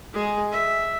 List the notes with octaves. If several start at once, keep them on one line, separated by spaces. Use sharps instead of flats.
G#3 G#4
E5